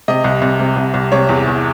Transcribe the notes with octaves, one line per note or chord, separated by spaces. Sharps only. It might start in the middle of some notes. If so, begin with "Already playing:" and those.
C3 D#5
C2
C2
C3
C2
C2
C3 C#5
E2
E2